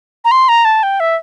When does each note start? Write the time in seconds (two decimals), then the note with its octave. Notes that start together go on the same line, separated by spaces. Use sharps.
0.25 A#5
0.31 C6
0.49 A#5
0.65 A5
0.83 G5
1.00 E5